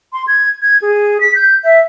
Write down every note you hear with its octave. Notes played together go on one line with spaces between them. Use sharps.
C6
G#6
G#6
G#4
B6
G6
E5